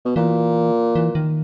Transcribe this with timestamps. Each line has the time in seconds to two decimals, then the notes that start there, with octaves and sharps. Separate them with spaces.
0.06 B2
0.16 A#2 E3
0.95 E3
1.15 D#3